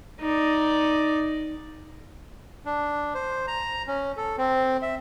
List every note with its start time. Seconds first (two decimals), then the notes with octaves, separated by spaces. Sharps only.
0.20 D#4 D5
2.66 D4
3.15 C5
3.47 A#5
3.87 C#4
4.17 A4
4.38 C4
4.82 E5